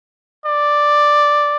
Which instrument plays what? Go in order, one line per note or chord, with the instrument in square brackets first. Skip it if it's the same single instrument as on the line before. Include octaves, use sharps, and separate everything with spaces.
[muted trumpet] D5